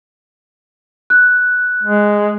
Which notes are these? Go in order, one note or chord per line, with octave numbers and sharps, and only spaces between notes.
F#6
G#3